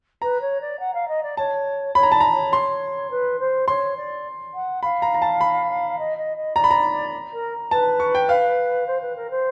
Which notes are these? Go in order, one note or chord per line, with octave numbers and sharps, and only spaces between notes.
B4 A#5
C#5
D5
F#5
F5
D#5
D5
C#5 A5
C#5 B5
A#5
D5 A5
A#5
C#5
C6
B4
C5
C#5 C6
D5
F#5
F5 B5
A#5
A#5
A5
B5
D#5
D#5
D#5
D5 A#5
B5
A#5
A#4
B4 A5
C#6
G5
F5
C5
B4
A#4
C5